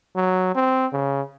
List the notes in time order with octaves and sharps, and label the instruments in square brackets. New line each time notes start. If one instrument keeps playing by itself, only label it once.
[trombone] F#3
C4
C#3